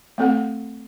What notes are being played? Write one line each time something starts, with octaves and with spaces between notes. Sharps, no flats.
A3 C4 A4 F#5